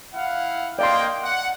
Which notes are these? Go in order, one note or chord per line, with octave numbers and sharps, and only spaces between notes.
E4 F5 F#5
A#3 D5 D#5 F5 G5 C6
F#5